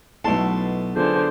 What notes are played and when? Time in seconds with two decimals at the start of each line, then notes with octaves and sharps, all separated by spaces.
0.24 B1 B2 A3 B3 E4 A4 A5 C6
0.96 D3 B3 F4 G#4 C5